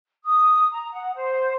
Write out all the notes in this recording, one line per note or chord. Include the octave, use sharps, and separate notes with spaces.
D#6
A#5
F#5
C5